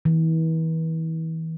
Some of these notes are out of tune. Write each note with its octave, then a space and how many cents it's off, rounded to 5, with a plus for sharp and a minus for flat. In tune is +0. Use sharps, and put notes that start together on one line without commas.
E3 -35